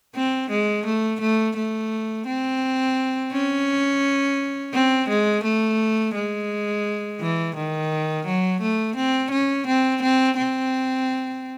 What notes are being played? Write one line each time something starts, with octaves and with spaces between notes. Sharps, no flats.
C4
G#3
A3
A3
A3
C4
C#4
C4
G#3
A3
G#3
E3
D#3
F#3
A3
C4
C#4
C4
C4
C4